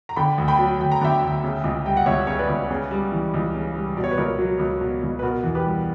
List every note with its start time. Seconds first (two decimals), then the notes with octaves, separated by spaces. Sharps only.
0.09 A#5
0.16 D3 G5 B5
0.38 D2
0.48 G5 B5
0.59 F#3
0.80 D2 G5
0.91 A#5
1.01 D3 E5 G5
1.23 D2
1.44 C#3
1.64 C#2
1.85 G3 G5
1.97 F#5
2.06 C#2 C#5 E5
2.27 C#3 C#5
2.39 B4 D5
2.49 C#2
2.71 C#3
2.91 G3
3.12 E3
3.34 C#2
3.55 C#3
3.76 G3
3.97 B2 D5
4.04 C#5
4.11 B4
4.17 C#2 A#4 C#5
4.39 F#3
4.59 C#2
4.81 B2
5.03 C#2
5.19 B4
5.23 B2 F#4 A#4
5.44 E2
5.55 G4 B4
5.65 G3